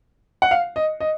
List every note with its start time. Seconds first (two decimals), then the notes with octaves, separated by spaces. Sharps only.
0.42 F#5
0.51 F5
0.76 D#5
1.00 D#5